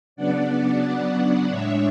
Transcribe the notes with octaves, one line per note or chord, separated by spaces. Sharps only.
C#3 F#3 B3 D4 D5 F#5
A2 G#3 D4 C#5 E5